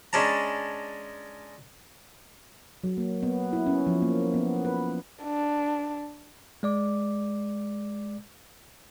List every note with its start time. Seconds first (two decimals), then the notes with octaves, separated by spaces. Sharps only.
0.13 G#3 C#4 D4 A5 A#5
2.84 F#3
2.97 A#3
3.23 B3
3.53 E4
3.67 C#4
3.87 F3
4.02 A#3
4.34 B3
4.65 B4
5.24 D4
6.63 G#3 D5 D6